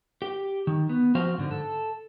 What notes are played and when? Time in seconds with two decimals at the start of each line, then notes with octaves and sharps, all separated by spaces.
0.22 G4
0.67 D#3
0.89 B3
1.15 F3 C4 F#4 C5 F5
1.38 G#2 D3
1.51 A4